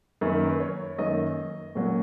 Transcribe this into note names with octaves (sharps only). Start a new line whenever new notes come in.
F#2 D#3 A#3 B4
A#4
B4
C#5
F#2 D#3 A#3 D#5
A#2 F#3 A#3 C#4